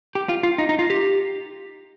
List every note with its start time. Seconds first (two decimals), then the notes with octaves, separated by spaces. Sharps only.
0.15 G4
0.29 F4
0.43 F4
0.58 D#4
0.69 D#4
0.79 F4
0.90 G4